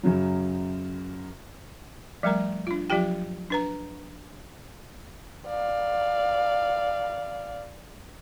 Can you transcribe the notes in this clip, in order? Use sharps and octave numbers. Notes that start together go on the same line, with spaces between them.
F#2 C#3 F#3
F3 G3 A3 A#4 A#5
D4 F4
F3 F#3 F4 G4 G5
D4 B4 A#5
D5 F5